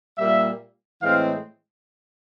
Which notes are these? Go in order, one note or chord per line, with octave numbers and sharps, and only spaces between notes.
A#2 G3 A#3 E5
A2 E3 G#3 C4 F5